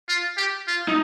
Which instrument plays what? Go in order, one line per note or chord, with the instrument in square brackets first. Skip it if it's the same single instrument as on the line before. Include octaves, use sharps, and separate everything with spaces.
[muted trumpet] F4
G4
F4
[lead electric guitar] D#4